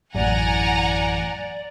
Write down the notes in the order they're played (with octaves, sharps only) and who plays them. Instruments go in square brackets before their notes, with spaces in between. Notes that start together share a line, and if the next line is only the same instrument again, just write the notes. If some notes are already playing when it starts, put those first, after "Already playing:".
[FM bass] A1 [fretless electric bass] F#2 A2 E3 [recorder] D5 [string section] F#5 G#5 A#5